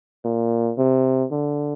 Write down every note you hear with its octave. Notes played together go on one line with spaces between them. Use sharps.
A#2
C3
D3